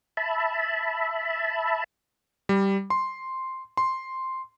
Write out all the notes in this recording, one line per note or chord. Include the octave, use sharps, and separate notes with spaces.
E5 A5 B5
G3
C6
C6